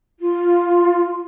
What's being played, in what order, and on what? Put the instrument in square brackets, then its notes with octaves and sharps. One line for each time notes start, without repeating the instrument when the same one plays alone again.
[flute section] F4